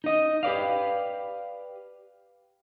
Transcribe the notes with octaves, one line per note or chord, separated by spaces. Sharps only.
D#4 D#5
G4 B4 D5 F5